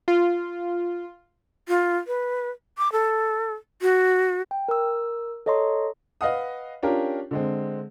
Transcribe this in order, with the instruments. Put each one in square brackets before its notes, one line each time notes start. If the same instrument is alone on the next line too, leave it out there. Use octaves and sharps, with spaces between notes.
[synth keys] F4
[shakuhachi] F4
B4
D6
A4
F#4
[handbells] G5
A#4 E6
A4 C#5 D#5 A#5 C6
[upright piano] B4 D#5 F5 F#5 D#6
C#4 D4 F4 G4 A#4
D3 G#3 C4